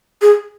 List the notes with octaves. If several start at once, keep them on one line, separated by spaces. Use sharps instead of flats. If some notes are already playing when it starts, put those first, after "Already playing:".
G#4